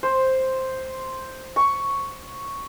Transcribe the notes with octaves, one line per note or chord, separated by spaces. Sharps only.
C5
C#6